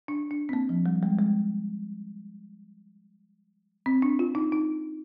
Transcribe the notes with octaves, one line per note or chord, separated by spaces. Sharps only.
D4
D4
C4
A#3
F3
G3
G#3
G#3
C4
D4
F4
D#4
D#4